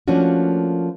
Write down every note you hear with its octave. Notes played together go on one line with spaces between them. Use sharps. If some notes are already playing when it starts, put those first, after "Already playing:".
F3 A3 A#3 C#4 D4 F#4